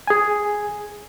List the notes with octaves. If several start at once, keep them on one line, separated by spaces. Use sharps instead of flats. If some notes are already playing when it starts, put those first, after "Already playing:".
G#4 G#5